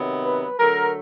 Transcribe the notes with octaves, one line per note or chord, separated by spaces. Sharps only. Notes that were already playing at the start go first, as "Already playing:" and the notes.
Already playing: C3 D#3 F#3 B3
B4
D3 F#3 A3 A#4